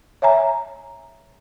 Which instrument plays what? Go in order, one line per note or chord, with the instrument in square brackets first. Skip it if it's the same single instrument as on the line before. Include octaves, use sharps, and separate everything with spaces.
[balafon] C#5 E5 G#5 A#5